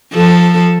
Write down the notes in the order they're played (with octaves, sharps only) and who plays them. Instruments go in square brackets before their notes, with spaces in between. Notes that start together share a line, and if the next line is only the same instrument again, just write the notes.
[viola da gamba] F3 A4